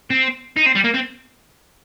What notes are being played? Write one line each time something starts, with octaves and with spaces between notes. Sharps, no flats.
C4
D#4
C4
G3
A#3
C4